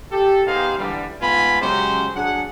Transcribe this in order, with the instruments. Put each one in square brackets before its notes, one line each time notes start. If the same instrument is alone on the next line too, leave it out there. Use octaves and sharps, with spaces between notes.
[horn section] G4 A4
B3 D#4 G4 G#4 C5 F5
G#2 D3 E3 G3
G#2 A3 B3 F4 G#5 B5
C#3 F#3 G#3 C#4 G4 C5
F#3 D4 G#4 F#5